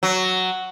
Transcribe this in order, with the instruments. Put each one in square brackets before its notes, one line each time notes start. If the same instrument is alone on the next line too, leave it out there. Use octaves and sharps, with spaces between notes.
[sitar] F#3